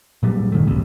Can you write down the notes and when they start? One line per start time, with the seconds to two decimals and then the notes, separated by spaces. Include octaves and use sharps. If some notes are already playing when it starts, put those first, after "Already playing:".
0.23 A#2 F#3 G3
0.52 G1 D#3 A3
0.67 A1 D2 C3